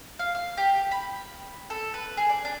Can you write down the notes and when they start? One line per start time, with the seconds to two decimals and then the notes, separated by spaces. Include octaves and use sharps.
0.19 F5
0.35 F5
0.57 G4
0.91 B5
1.70 A4
1.94 B4
2.17 G#4
2.30 D5
2.45 D4